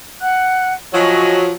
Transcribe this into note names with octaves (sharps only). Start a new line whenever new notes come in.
F#5 F#6
F3 F#3 D#5 G#5 C#6